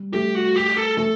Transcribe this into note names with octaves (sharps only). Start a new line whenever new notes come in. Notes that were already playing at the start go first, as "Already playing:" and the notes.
Already playing: G3
A3 G4
F#4
G4
A4
A3 A4